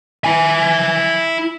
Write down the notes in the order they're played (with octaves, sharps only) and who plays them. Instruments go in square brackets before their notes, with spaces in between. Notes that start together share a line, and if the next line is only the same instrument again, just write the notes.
[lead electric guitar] E4 G#5